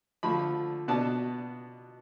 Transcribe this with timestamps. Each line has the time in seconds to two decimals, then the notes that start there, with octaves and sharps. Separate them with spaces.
0.23 D3 F3 A3 B5
0.88 B2 B3 D4 A5